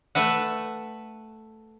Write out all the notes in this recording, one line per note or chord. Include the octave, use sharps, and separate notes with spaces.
A3 B4 E5 F#5